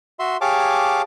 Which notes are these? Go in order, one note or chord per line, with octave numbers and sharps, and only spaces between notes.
F#4 E5 C6
G4 G#4 C#5 F5 A5 D6